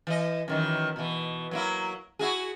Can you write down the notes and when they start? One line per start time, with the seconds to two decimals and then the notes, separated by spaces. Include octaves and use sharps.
0.07 E3 D#5
0.48 F#2 D#3 E3
0.96 B2 E3
1.51 F#3 A#3 E4
2.19 E4 F#4 G#4